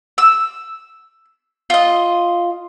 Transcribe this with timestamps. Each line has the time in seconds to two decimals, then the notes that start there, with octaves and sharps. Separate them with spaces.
0.18 E6
1.70 F4 D#5